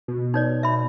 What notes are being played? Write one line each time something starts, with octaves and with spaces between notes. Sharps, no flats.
B2
D#4 C#5 D5
E5 B5